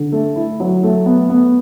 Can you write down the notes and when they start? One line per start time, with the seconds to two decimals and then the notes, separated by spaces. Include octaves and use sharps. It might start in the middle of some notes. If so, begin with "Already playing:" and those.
Already playing: D3
0.12 A3
0.36 E4
0.60 F#3
0.83 A3
1.06 B3
1.29 B3